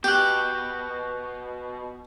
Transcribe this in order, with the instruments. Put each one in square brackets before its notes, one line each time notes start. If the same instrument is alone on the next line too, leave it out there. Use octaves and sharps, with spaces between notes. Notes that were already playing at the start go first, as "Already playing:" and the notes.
[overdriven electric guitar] B2 [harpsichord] G4 [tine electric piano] F#6 G6